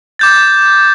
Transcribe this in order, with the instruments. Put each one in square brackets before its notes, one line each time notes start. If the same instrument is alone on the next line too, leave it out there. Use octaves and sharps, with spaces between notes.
[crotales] D6 G6 A6